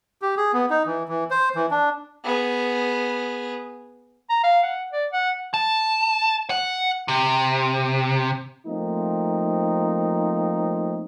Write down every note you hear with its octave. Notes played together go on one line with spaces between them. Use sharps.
G4
G#4
B3
D#4
E3
E3
C5
E3
D4
B3 G#4
A#5
F5
F#5
D5
F#5
A5
F#5
C3
F3 A3 A#3 C4 D#4